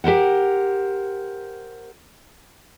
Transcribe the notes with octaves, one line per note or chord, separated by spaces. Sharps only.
G4 A#4 C5 F#5